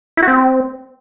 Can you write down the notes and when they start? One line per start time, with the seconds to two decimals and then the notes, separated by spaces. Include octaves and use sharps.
0.17 E4
0.23 F#4
0.28 C4